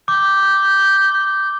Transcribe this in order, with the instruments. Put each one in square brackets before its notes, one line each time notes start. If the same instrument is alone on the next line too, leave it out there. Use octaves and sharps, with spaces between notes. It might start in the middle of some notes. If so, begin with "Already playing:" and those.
[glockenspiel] D6 [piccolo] G6